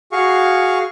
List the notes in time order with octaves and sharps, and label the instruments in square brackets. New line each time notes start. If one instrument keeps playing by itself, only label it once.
[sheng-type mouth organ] F#4 G#4 F5 C#6